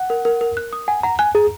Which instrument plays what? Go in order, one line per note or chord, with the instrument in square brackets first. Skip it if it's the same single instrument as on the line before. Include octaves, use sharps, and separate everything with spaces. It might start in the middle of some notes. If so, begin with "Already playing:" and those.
Already playing: [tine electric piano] F#5
[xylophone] A#4
A#4
A#4
F#6
D#6
[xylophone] F#5 [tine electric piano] G#5
[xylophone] F#5 [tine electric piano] A#5
[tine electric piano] G#5 [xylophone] F#6
[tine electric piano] G#4 [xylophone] A#5